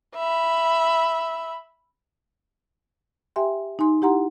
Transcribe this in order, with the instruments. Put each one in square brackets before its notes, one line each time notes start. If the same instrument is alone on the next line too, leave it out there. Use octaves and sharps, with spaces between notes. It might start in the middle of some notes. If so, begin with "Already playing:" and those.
[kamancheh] E5 B5
[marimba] G4 E5 G5 G#5 C6
D#4 G#5 C6
E4 G4 F#5 A#5 C6